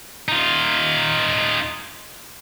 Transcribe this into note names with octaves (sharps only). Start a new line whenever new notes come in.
D#4 F4